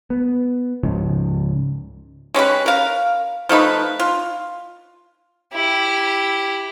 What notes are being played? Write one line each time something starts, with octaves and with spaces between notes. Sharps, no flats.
B3
C#2 G#2 C#3 F3
G#3 C#4 G4 B4
A#4 F5
F3 A3 D#4 B4
F4
E4 G4